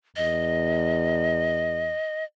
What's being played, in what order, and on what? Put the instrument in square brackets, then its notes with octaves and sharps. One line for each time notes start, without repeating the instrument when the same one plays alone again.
[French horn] E2 [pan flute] D#5